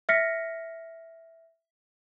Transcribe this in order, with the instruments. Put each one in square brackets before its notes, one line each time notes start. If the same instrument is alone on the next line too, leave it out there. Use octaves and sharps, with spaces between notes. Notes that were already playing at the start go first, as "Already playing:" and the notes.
[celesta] E5 F6 A#6 B6 C#7